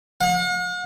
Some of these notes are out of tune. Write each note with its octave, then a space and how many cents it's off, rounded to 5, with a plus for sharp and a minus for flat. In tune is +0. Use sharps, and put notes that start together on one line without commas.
F#5 -45